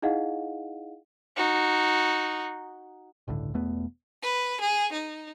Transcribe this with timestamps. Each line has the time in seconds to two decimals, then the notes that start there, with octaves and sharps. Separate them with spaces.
0.02 D#4 E4 G#4 D#5 F5 F#5
1.36 D#4 F#4
3.28 G1 C#2 A2 D3
3.54 E1 E2 A3 B3
4.23 B4
4.61 G#4
4.93 D#4